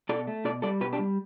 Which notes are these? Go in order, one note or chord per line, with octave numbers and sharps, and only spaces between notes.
B2 A4 D5
A3
B2 A4 D5
G3 A4 D5
B2 G4 B4
D4 G4
G3